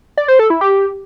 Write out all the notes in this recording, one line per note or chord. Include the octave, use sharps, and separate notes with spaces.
D5
C5
A4
E4
G4